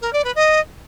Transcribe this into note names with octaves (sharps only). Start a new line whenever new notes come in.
A#4
D5
B4
D#5